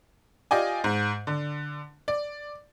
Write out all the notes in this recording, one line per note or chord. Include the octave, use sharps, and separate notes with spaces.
F4 G4 D5 D#5 G#5
G#2
D3
D5